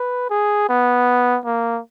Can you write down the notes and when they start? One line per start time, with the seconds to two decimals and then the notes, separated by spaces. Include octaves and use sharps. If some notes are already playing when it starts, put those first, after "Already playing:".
Already playing: B4
0.30 G#4
0.69 B3
1.46 A#3